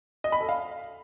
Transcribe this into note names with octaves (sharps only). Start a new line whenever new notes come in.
D#5
B5
A4
F5